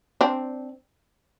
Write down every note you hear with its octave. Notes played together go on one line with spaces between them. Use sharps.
C4 D4